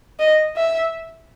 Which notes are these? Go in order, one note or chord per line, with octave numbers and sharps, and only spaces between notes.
D#5
E5